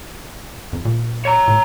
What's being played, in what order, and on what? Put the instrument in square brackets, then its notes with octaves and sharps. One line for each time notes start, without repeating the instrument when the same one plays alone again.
[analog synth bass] F2
A#2
[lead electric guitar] C#5 A#5
[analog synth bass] A2